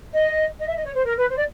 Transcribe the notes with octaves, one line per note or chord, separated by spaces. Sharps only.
D#5
D#5
E5
D#5
C#5
C5
A#4
B4
C5
D5